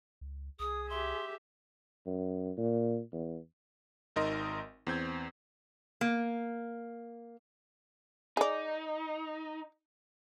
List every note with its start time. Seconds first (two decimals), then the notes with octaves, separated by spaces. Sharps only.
0.21 C#2
0.60 C2 G#4 D#6
0.90 G4 E5 C6
2.06 F#2
2.57 A#2
3.12 E2
4.16 G#1 D#4 A#4 D#5 C6
4.87 E2 C4 G6 G#6
6.01 A#3
8.37 D#4 G#4 D5